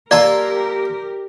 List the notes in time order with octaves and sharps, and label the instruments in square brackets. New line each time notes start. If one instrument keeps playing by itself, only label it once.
[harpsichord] A#3 F4 A4 [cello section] G4 A#4 [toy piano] D5